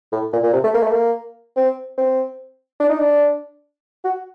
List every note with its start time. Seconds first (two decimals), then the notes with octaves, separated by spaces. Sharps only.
0.12 A2
0.33 A#2
0.43 A#2
0.53 C3
0.64 A3
0.74 A#3
0.83 A3
0.92 A#3
1.56 C4
1.98 C4
2.80 D4
2.89 D#4
2.98 D4
4.04 F#4